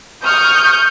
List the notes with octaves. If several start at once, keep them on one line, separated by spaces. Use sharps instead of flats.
C#6 D#6 F6 G6